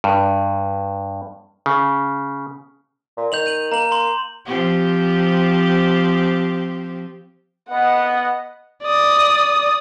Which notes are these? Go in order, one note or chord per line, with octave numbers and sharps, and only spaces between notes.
G2
C#3
A#2
D#3 G6 F7 F#7
G6 D#7 F#7
A#3 A#5 F#7
A#5 C6 F#7
F3 C4 G4
B3 D#5 F#5
D5 D#6